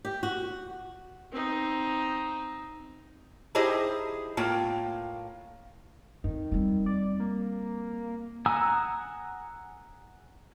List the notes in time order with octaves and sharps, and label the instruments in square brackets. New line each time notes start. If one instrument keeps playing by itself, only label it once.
[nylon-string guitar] G4
F#4
[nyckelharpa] C4 D#4
[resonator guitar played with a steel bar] D#4 E4 G4 G#4 C5 D#5
A2 A#3 F4 G5
[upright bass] F2 [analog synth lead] D#3
[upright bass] G3 C4
[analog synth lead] D5
A#3
[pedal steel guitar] F#5 G#5 A#5 D#6 E6